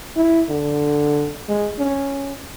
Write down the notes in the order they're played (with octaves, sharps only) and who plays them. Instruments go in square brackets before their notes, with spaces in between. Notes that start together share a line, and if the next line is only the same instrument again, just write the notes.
[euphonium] E4
D3
G#3
C#4